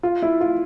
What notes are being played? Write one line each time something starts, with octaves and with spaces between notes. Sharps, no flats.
F4
E4
F4